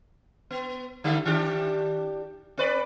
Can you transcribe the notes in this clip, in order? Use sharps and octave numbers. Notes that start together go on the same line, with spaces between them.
B3
D3 G3 A3
D#3 D4 G4
C4 B4 D5